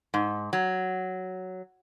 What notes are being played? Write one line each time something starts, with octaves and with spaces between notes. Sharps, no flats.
G#2
F#3